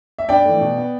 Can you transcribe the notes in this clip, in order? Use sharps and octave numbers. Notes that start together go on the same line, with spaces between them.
E5
G2 D5 G5
E3 A3
B2
B3